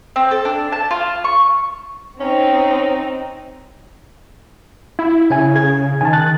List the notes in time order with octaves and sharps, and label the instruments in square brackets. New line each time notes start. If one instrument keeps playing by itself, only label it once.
[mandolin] C4
A4
D4
A5
F4
C#6
[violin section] C4 D#4 [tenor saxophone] C#4
[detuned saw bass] E4
[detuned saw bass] C#3 [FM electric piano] E4 G#5
[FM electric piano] G#4 G#6
[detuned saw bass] D#3 [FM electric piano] G#5 A5
[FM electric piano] F#6 A6